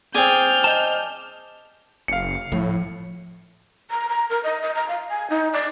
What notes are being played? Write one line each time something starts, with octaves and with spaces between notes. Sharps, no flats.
C4 G#4 D5 G#5 F6 G6
D#5 A5
F#1 F5 C#7
A2 F3
A#5
A#5
A#4
D#5
D#5
A#5
F5
G#5
D#4
D5